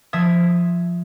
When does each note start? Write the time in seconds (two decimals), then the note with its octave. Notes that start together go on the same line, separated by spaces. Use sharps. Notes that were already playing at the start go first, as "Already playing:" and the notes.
0.13 F3 E5 D#6 G#6